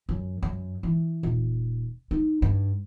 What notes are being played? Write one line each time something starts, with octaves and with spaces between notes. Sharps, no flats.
F#2
F#2
E3
D#1
D#4
G2